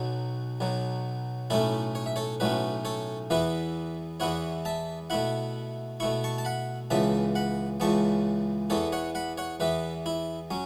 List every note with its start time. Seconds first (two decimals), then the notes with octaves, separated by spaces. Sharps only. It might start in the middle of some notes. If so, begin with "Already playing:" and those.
Already playing: B1 B2 F#3 F#4
0.60 B1 B2 F#3
1.50 B1 A2 A3 C#4 E4 A4
1.95 C#5
2.06 E5
2.16 A4 C#5
2.40 B1 A2 A3 C#4 F#4 B4
2.85 A4 C#5
3.30 E2 E3 B3 E4 B4 E5
4.20 E2 E3 B3 E4 C#5 F#5
4.65 E5 A5
5.10 B2 A3 E4 F#5 B5
6.00 B2 A3 E4 C#6
6.24 A5 C#6
6.38 A5
6.45 F#5 B5
6.90 C#2 C#3 E3 B3 E5 A5
7.35 F#5 B5
7.80 C#2 C#3 E3 B3 A5 C#6
8.70 E2 E3 B3 A4 C#5
8.92 C#5 F#5
9.15 F#5 B5
9.38 C#5 F#5
9.60 E2 E3 B3 B4 E5
10.06 E4
10.51 F#3 C#4